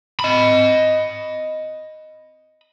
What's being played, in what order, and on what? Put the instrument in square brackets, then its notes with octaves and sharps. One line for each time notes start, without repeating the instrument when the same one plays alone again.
[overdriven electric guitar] D#5 B5